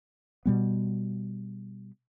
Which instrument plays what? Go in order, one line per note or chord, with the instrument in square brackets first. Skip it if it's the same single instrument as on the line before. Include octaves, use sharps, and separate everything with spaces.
[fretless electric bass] B2 G3 B3